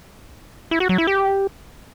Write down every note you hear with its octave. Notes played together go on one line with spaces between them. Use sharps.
E4
F#4
F#3
E4
G4